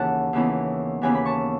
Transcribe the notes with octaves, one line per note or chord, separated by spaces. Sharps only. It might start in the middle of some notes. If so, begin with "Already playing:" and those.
Already playing: D#2 C#3 E3 F#5 A5 B5
D#2 C#3 E3 B3
D#2 C#3 E3 B3 G#5 B5
B5
A5 C#6